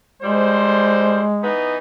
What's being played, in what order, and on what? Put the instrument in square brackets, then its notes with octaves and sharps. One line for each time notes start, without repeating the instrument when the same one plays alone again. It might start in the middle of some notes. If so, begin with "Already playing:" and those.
[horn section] A2 G3 C5 [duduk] G#3
[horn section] E3 B3 D#4